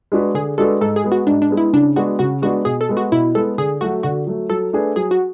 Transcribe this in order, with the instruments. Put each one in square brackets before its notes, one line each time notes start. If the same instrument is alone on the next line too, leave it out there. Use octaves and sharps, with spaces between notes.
[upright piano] G#3 D4 F#4 B4
[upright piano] D3 [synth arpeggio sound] G#4
[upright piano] G#3 D4 F#4 B4 [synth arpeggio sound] A4
[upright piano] G#2 [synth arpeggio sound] A4
[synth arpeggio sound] G#4
[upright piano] G#3 B3
[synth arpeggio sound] F#4
[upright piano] G#2 [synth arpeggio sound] D4
[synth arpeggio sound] D4
[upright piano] G#3 B3
[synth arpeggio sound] E4
[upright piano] C#3 [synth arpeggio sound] D4
[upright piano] G#3 B3 D4 [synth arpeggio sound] F#4
[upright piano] C#3 [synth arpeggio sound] F#4
[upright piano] G#3 B3 D4 [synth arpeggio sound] F#4
[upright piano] B2 [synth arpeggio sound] G#4
[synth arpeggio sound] A4
[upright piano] G#3 B3
[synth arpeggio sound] F#4
[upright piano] B2 [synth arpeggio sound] E4
[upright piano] G#3 B3 [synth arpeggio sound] A4
[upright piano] D3 [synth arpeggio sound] G#4
[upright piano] F#3 A3 [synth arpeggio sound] F#4
[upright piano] D3 [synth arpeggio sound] F#4
[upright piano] F#3 A3
[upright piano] F#3 [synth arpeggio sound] A4
[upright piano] A3 D4 G#4 B4
[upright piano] F#3 [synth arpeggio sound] G#4
[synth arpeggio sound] F#4